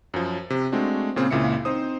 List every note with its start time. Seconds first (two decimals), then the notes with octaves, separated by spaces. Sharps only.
0.14 F#2 F3
0.50 C3
0.72 G#3 A3 C4 D4 F#4
1.16 A#2 C#3 C4
1.31 C#2 A#2 C#3 E4 C#7
1.65 C4 D#4 C5 D#6